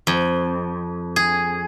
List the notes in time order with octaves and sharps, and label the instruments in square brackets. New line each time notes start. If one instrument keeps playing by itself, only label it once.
[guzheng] F2
G#4